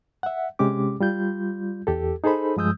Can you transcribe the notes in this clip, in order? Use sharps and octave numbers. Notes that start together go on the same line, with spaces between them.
E5 F#5
C3 G#3 C#4 G4 D6
G3 F4 G6
E2 G4 A4
D#4 G#4 A4 C5 B5
G2 F3 G#3 D#6 E6 G6